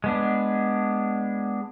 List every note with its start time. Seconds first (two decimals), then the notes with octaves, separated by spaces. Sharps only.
0.04 G#3 B3 D4